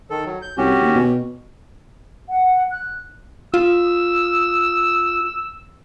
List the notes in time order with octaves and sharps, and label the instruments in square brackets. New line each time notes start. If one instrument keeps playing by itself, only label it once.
[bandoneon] D#3 A4
F#3
G6
[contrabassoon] C2 [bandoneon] C#4 F#4 G4
[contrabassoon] D#2
B2
[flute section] F#5
F#6
[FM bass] F4 [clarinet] E6